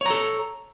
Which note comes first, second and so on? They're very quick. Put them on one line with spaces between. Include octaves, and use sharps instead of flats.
C#5 A#5 A4